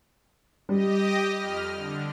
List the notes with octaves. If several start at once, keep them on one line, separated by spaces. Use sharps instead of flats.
G3 G4 D#5
F2 F6
D3